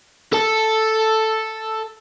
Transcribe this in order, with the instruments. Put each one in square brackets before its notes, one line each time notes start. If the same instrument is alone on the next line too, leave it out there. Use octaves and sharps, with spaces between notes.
[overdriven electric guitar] A4 A5